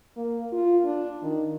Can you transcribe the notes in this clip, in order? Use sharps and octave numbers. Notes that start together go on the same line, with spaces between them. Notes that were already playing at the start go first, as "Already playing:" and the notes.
A#3
F4
D4
D#3